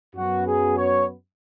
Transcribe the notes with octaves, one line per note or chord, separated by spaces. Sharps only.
F#2 F#3 B3 F#4
G#4
C#5